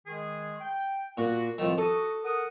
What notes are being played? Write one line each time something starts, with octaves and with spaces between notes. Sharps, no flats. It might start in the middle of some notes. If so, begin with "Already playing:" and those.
D#3 G#3 G#4
G5
A#2 F#4
F2 A2 D#3 A3
F#4 A4 D#6
A#4 F#5 D#6